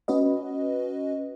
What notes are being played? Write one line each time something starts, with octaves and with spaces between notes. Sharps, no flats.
C#4 F#4 B4 D#5